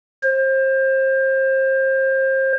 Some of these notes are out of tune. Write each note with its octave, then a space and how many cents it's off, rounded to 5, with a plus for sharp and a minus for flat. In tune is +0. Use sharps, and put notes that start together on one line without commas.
C5 +30